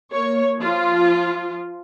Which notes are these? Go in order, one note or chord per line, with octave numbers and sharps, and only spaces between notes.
A#3 C#5
F3 F4